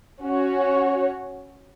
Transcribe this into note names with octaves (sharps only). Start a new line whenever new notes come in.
C#4 F#4 C#5